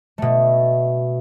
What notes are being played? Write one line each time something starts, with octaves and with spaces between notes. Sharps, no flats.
B2 A3